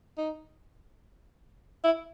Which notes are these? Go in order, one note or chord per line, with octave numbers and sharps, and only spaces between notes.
D#4
E4